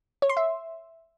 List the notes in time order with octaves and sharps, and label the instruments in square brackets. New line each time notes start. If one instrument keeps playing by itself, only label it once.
[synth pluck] C#5
C6
E5